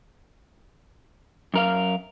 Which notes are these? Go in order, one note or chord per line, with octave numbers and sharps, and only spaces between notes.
F#2 A#4 F5